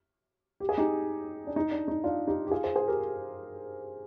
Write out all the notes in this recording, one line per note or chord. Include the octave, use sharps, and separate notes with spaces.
G4
G#4
D#4 G4
D4
D#4
D4
D#4
D4 F4
D#4 G4
G4
F4 G#4
G#4 C5
G#4 C5
G4 A#4